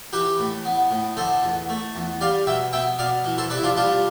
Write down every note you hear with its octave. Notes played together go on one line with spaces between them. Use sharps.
E3 G4 B4
A2
B3
A2
D3 A4 C5
E2
A3
E2
G3 D5 F5
B2 E5 G5
B3 E5 G5
B2 D5 F5
E3
A4 C5
C3 B4 D5
E4
D4 F4
G3 D4 F4